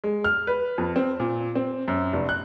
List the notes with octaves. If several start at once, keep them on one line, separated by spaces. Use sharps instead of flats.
G#3
F6
B4
F2
C4
A#2
C4
F#2
F1
F#6